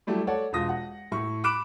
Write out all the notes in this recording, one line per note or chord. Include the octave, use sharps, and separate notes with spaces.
F#3 G3 A3 E4
A4 C#5 D5 F#5
E1 F4 D#6 A#6
F#5
A2 E4 C#6
B5 D6 F#6 D7 E7